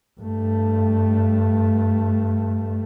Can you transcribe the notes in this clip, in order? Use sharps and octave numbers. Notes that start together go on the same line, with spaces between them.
G2 A3